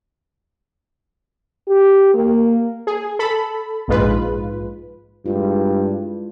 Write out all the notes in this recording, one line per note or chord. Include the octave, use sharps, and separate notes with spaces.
G4
A#3
G#4
A4 B5
A#1 G#2 G#3 F4 B4
G2 G#3 E4 F4